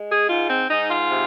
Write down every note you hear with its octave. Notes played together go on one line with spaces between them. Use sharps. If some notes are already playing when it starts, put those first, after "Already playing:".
Already playing: G#3
G#4
G#2 F4
C4
G#2 D#4
F4
C3